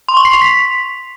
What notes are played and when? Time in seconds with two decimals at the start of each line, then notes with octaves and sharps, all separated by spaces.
0.08 C6
0.17 C#6
0.25 C7
0.33 F7
0.41 B6